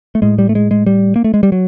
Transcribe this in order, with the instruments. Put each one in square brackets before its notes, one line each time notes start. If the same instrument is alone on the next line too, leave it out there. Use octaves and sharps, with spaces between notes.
[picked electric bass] A3
A2 G#3
G3
A3
G#3
G#3
G3
A#3
A3
G#3
G3
F#3